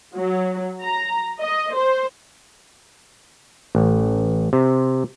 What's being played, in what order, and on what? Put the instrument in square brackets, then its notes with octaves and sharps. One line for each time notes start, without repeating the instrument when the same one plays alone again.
[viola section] F#3
A#5
D#5
C5
[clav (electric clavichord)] A1
C3